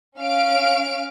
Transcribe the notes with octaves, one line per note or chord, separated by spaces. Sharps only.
C#4 F5 F6 D7